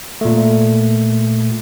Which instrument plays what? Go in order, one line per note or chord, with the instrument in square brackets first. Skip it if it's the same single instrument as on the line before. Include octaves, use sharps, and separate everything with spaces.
[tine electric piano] A#2 A3